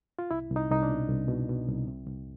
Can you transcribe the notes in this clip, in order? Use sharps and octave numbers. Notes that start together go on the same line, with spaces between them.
F4
C2 E4
C2
D#4
C2 D#4
D4
B2
C2
B2
B2
C2
C3
C2